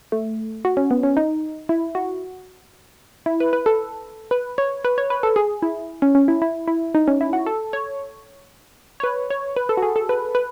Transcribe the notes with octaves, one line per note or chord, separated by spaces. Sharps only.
A3
F#4
C#4
B3
C#4
D#4
E4
F#4
E4
B4
B4
A4
B4
C#5
B4
C#5
B4
A4
G#4
E4
C#4
C#4
E4
E4
E4
D#4
C#4
E4
F#4
A4
C#5
C#5
B4
C#5
B4
A4
F#4
G#4
A4
B4
B4